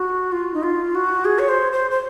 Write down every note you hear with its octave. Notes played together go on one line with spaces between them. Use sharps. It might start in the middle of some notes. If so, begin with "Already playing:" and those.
Already playing: F#4
F4
D#4
F4
F#4
G#4
C#5
C5
C5
C5